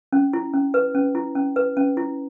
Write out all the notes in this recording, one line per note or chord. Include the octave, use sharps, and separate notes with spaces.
C#4
E4
C#4
B4
C#4
E4
C#4
B4
C#4
E4